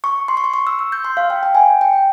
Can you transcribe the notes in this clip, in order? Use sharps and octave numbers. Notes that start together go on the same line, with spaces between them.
C#6
C6
C#6
C6
C#6
E6
E6
G6
C6
F5
G5
G5
G#5
G5